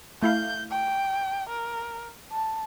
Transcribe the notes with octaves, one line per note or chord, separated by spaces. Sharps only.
A3 E4 F5 G6
G5
A#4
A5